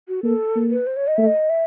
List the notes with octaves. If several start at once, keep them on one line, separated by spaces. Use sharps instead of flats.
F#4
A#3 A4
A#3
B4
C5
C#5
D#5
A3 E5
D#5
E5